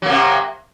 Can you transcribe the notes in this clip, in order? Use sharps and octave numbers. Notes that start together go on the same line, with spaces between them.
C3 F#3 A#3